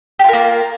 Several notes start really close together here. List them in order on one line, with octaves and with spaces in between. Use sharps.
G4 F4 A#4 A#3